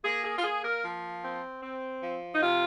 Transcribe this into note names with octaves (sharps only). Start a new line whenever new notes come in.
A#3 G#4
G#4
F4
A#3 G#4
A#4
F3
C4
C4
F3
D#4
C3 F4